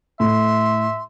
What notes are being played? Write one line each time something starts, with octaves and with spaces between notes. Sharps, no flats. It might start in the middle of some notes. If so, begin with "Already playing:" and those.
A2 E5 C6